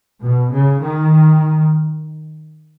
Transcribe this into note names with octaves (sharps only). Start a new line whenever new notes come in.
B2
C#3
D#3